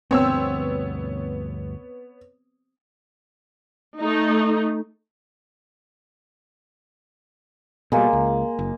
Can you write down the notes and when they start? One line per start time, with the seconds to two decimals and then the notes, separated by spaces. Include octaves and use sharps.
0.11 D2 G2 B2 B3 C4 C#5 E6
3.98 A3 D#4
7.92 B2 G3 G#3 A#3
8.13 C#2
8.59 F#1